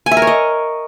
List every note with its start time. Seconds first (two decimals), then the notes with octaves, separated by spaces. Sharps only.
0.06 G#5
0.11 E5
0.17 A#4
0.22 C#5
0.27 D#5